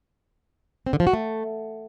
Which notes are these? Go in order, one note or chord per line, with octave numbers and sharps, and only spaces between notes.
C4
D3
F3
F#4
A3